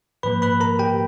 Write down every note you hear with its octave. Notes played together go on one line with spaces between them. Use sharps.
G#2 F3 A#3 B4 B5
B4 B5
A#4 A#5
G4 G5